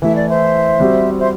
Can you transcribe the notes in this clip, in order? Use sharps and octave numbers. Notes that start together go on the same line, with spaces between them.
E3 A3 E4 E5
D5
C5 E5
G3 C4 F#4
C5 E5